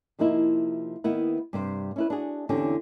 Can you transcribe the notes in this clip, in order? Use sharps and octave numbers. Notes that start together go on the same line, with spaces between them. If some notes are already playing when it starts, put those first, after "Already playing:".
C3 F3 A#3 D#4 E4
D#3 A#3 B3 E4
G2 C3 C5
C#4 E4 B4
D4 F#4 G#4
E2 D3 C4 C#4 G4